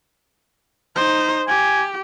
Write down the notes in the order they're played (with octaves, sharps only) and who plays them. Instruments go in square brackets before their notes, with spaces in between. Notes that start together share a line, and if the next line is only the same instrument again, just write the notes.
[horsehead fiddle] D#4 C5
[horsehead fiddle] G4 [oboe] G#5